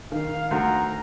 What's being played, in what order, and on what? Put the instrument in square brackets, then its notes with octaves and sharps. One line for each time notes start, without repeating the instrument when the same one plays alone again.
[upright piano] D#3 [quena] F5
[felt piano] D2 [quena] A#5